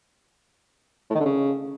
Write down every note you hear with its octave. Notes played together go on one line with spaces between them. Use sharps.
A2
D#3
D3
C#3